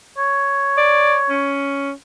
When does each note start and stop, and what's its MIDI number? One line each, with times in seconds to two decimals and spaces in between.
0.18 1.56 73
0.78 1.18 74
1.30 1.92 61